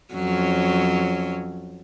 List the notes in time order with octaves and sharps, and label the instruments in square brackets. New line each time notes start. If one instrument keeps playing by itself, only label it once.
[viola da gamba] F2 F#3 C#4